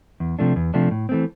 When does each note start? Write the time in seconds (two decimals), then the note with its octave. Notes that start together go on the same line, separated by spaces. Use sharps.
0.20 E2
0.39 C3 F3 A3 D4
0.56 E2
0.74 C3 F3 A3 D4
0.91 A2
1.09 E3 A3 C4